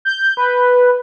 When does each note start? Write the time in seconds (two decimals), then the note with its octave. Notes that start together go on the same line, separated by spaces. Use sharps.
0.05 G6
0.37 B4